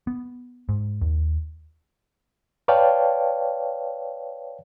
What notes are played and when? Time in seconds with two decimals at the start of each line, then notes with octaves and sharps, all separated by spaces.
0.07 B3
0.69 G#2
1.01 D#2
2.68 B4 C#5 D5 F5 G5 A5